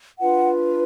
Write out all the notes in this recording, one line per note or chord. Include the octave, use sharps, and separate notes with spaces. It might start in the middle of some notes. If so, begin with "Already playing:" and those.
D4 F4 B4 F#5